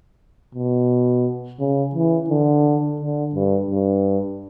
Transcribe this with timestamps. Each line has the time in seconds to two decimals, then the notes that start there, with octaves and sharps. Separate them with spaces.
0.55 B2
1.59 C#3
1.95 E3
2.29 D3
3.00 D3
3.35 G2
3.70 G2